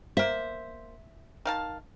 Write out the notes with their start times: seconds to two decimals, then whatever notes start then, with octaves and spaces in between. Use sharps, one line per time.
0.17 A#3 C5 E5
1.45 D#3 F5 A5